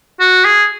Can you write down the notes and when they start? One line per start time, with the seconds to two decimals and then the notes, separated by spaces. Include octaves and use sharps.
0.20 F#4
0.45 G#4